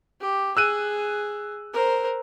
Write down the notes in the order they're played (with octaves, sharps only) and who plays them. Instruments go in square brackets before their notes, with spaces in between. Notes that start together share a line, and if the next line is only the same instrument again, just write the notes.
[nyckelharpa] G4
[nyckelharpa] G#4 [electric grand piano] E6 F#6 D#7
[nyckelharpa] A#4 C5